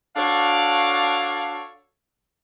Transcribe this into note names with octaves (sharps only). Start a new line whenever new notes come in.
D4 F#4 A4 C#5 D5 F5